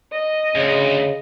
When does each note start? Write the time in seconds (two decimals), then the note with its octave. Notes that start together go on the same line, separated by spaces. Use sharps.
0.12 D#5
0.55 D2 C#3